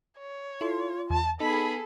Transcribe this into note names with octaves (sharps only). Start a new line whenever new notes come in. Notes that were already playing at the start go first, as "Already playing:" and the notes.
C#5
E4 F4 A4 C6
E2 A5
B3 D#4 G#4 A4 B5